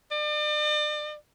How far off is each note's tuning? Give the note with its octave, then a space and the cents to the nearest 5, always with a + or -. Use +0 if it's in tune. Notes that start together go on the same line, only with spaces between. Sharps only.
D5 +40